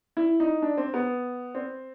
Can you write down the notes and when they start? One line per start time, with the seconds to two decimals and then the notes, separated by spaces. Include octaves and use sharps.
0.17 E4
0.40 D#4
0.62 D4
0.78 C4
0.94 B3
1.55 C4